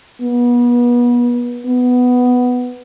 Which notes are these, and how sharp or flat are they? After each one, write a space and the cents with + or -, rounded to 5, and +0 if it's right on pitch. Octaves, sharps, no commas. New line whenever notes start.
B3 -30
B3 +5